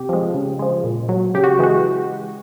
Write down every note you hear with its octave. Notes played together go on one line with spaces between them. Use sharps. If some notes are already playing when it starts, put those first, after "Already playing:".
Already playing: C3 G4
F3 G#3
C#3
F3 G#3
A#2
F#3
C#3 G4
F#4
E3 G#3 F#4